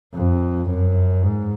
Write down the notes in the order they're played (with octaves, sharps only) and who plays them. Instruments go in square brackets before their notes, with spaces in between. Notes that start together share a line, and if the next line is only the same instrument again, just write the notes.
[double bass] F2
F#2
G#2